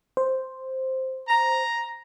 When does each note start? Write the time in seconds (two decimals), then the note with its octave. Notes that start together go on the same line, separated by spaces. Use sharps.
0.17 C5
1.29 A#5